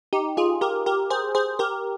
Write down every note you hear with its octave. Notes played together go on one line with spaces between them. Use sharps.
D#4 G4
F4 G#4
G4 A#4
G4 A#4
G#4 C5
G#4 C5
G4 A#4